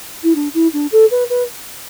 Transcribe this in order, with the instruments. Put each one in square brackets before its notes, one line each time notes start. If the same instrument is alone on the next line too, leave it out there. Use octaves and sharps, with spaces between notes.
[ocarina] E4
D4
E4
D4
A4
B4
B4